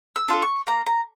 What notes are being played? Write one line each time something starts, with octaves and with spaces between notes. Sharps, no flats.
E6
D4 F4 A4
C#6
A#3 A#5
A#5